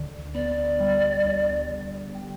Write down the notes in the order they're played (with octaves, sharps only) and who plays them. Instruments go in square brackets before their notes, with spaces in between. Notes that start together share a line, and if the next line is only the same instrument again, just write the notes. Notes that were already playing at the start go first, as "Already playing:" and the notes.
Already playing: [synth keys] D2 D3
[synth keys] B3 [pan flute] D5
[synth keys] G3
D2
D3
G3